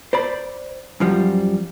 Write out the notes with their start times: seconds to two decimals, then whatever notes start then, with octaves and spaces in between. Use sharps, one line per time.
0.13 C5 D5 B5
1.00 F#2 F3 G3